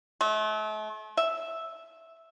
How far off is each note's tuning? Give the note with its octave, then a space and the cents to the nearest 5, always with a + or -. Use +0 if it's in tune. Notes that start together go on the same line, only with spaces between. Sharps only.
A3 -40
E5 -5